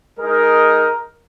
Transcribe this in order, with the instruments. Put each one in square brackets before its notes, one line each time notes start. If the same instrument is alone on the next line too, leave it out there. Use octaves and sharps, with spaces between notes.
[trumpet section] G#3 D#4 A#4